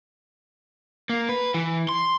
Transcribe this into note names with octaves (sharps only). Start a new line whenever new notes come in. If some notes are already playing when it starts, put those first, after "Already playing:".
A#3
B4
E3
C6